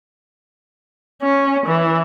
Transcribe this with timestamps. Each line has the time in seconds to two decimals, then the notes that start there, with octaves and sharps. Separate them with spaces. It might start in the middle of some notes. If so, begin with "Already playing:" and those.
1.22 C#4
1.66 E3